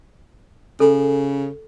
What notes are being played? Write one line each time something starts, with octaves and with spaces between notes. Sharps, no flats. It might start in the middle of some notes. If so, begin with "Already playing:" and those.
C#3 A4